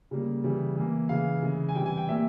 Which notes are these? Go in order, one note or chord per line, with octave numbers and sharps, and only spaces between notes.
C#3 G3 A#3
C#3 E3 G3
E3 A#3
C#3 E3 G#3 F5
C#3 E3 G#3
G#5
C3 E3 G3 G5
G#5
G5
A#2 G3 A#3 E5